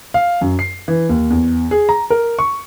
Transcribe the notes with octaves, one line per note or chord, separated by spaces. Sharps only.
F5
F#2
C7
E3
D#2
E2
G#4
A#5
A#4
C#6